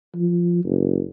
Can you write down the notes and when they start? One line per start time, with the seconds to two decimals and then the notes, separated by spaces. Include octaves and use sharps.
0.15 F3
0.65 F#1